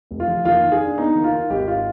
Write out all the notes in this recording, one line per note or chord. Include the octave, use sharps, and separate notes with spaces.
F1
F4
F2
D#2 F4
D#3
G#4
D4
B3 D#4
D#2
F4
D#3
G#1 G4
F4